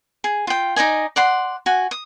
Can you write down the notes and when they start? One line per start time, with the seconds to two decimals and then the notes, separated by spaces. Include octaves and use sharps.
0.24 G#4
0.47 F4 G5
0.76 D#4 D5 D#5 G#5
1.16 D5 F#5 C6
1.66 F#4 G#5
1.91 D#6